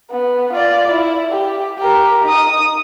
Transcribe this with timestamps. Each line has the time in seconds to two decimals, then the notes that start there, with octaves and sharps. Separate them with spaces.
0.10 B3
0.53 F4 D5
0.91 E4
1.32 G4
1.78 G4 A#4
2.24 D#4 D#6